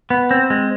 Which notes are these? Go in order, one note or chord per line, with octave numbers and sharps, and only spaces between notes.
B3
C4
G#3